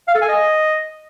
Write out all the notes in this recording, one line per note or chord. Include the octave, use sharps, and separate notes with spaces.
F5
A4
G#5
D#5